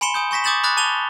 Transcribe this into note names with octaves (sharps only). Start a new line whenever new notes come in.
G#5 B5 C6 C#7 E7 G7
G#5 D#6 G6
G#5 C#6 A#6 B6 E7
D6 D#6 G6 A6 E7 F#7
B5 D6 D#6 F#6 A6
A5 D6 A6 F7 G7